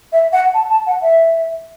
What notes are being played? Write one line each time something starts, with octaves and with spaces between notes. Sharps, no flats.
E5
F#5
A5
A5
F#5
E5